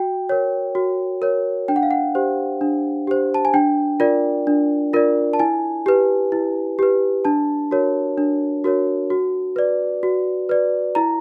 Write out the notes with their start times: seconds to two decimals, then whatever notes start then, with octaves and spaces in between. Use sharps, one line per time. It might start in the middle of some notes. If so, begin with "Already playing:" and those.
Already playing: F#4 G5
0.29 A#4 C#5
0.75 F#4
1.22 A#4 C#5
1.68 D4 G5
1.76 F#5
1.83 F5
1.91 F#5
2.15 G4 C5
2.61 D4
3.07 G4 C5
3.34 A5
3.45 G#5
3.54 D4 G5
4.00 F4 A#4 D5
4.47 D4
4.93 F4 A#4 D5
5.33 A5
5.39 E4 G#5
5.86 G4 B4
6.32 E4
6.79 G4 B4
7.25 D4 A5
7.71 F#4 A#4 C#5
8.18 D4
8.64 F#4 A#4 C#5
9.10 F#4
9.56 B4 D5
10.03 F#4
10.49 B4 D5
10.95 E4 A#5